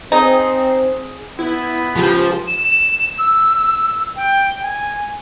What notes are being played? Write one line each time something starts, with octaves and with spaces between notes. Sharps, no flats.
C4 D#4 G#4 D#6
B3 E4
C#2 F3 G4
E7
E6
G5
G#5